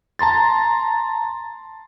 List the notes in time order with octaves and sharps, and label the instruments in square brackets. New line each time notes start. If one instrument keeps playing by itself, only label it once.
[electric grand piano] A5 A#5 C6 A6